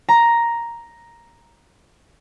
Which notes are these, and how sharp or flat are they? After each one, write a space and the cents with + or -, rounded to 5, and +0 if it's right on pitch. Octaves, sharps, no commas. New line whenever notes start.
A#5 +5